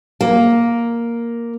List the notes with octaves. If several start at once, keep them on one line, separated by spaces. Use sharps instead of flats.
A#3